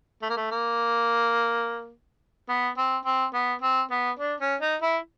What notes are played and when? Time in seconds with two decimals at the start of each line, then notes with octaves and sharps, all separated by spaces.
0.22 A3
0.30 A#3
0.37 A3
0.51 A#3
2.49 B3
2.77 C4
3.06 C4
3.34 B3
3.62 C4
3.91 B3
4.19 D4
4.40 C#4
4.61 D#4
4.82 E4